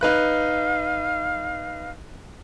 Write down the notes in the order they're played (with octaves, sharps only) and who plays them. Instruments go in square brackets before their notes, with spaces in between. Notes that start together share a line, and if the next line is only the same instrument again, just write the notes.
[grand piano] D#4 B4 F#6 [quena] F5